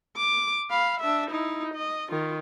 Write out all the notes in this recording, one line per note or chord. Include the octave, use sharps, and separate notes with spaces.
D6
F5 B5
D4 E5
D#4 E4
D#5
D#3 F4